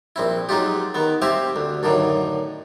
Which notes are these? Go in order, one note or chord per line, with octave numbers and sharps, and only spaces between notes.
A#1 C4 E4
F#3 G#3 D#4 F4 G4
D#3 B3
C4 G4 C5 E5 F5 G#5
D2
F#2 A2 D3 D#3